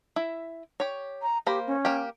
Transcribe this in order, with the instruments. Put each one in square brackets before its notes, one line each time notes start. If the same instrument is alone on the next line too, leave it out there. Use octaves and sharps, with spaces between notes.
[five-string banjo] E4 E5
G4 C#5
[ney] A#5
[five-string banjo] A#3 C5 B5 [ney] G4
[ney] C#4
[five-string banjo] A#3 G4